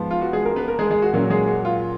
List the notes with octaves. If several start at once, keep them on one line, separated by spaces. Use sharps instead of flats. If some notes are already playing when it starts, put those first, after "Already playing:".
Already playing: G#2 F3 B3
F4
F#4
G#3 G#4
A#3 A#4
B3 B4
A#3 A#4
G#3 G#4
G#3 G#4
F#4
A#2 F#3 A#3 C#4 F#4
G#3 G#4
F#4
F4